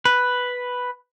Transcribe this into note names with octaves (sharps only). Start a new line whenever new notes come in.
B4